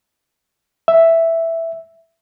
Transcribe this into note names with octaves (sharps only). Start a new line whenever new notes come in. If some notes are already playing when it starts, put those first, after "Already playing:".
E5